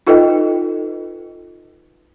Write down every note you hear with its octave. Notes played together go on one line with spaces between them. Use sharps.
D#4 F4 A4 B4 D#5 G5